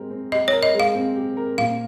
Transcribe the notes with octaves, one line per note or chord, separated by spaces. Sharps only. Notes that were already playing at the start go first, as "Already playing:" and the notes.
Already playing: G#3 C4 G4 A#4
C4
G4 D#5
C#5
A#4
D#5
G#3
F5
C4
G4
A#4
A#2 F5